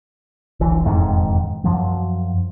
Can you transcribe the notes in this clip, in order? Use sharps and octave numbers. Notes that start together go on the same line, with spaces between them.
D#1 A#1 E3
E1 F2 G#2 D#3
F#2 F3 F#3